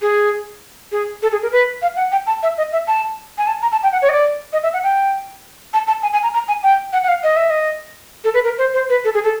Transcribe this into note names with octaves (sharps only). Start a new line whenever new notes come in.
G#4
G#4
A4
G#4
A#4
B4
F5
F#5
G5
A5
E5
D#5
E5
A5
G#5
A5
A#5
A5
G5
F#5
C#5
D#5
D5
D#5
E5
F#5
G5
A5
A5
G#5
G#5
A#5
A#5
G#5
G5
F#5
F#5
F5
D#5
E5
D#5
A4
B4
A#4
C5
C5
B4
A4
G#4
A4